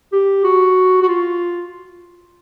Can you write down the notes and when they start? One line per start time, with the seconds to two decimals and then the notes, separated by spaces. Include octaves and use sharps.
0.12 G4
0.44 F#4
1.02 F#4
1.08 F4